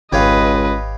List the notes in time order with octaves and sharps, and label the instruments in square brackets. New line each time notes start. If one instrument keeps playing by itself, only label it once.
[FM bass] G#1 [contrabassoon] C#2 [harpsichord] G4 C#5 F5 [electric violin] B4 D#5